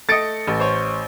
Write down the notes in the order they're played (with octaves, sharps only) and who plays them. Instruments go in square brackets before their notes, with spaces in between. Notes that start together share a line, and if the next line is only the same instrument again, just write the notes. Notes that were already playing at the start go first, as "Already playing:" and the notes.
[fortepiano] A3 D#5 [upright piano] A6 C#7 D7
[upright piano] A1
[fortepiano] C5 C#5